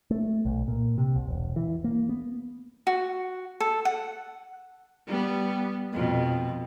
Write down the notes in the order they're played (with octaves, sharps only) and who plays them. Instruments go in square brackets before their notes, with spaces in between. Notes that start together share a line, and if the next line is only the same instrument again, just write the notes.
[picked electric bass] A3
B1
A#2
C3
C2
E1
E3
A#3
B3
[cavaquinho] F#4
A4
F#5
[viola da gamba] G3 B3
F2 B2